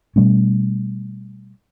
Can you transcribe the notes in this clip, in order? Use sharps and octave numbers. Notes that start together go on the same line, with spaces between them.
B2 G3 A3 C#4